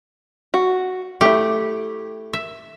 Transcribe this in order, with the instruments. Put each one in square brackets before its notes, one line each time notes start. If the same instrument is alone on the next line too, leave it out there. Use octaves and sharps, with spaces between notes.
[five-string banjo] F#4
[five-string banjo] A3 E4 [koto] G4
[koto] E5